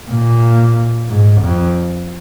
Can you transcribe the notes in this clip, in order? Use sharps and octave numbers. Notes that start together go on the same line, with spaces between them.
A#2
G#2
F2